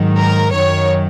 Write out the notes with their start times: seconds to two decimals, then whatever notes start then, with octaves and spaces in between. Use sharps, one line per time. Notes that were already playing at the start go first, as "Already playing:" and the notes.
Already playing: G#2 D#3 F#3
0.18 A#4
0.51 F#2 D#3 F#3 C#5